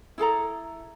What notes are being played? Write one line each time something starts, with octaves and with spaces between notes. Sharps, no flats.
E4 G#4 A4 A#5